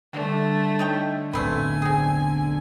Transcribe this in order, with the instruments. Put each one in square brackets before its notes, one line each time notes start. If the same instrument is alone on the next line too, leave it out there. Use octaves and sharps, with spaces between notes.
[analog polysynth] D3 [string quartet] G3 A3
[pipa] D#4 C#5 G5
[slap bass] D1 B1 E2 [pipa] A3 C4 B4 [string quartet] G#5
[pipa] C4 G#4